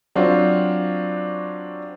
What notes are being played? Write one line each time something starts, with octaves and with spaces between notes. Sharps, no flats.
F#3 C4 D4 F4 F#4